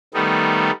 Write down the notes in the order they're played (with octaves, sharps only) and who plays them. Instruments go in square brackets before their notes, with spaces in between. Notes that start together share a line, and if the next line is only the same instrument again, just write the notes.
[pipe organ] D#3 G3 A3 B3 D#4